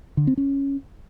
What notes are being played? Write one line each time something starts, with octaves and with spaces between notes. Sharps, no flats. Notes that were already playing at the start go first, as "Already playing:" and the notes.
D3
C4
C#4